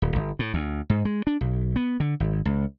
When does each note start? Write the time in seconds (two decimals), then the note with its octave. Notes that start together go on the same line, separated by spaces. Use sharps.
0.02 D#1
0.16 G1
0.39 A2
0.54 D2
0.90 G#2
1.05 G#3
1.27 D4
1.41 B1
1.76 B3
2.00 D3
2.20 G#1
2.45 C#2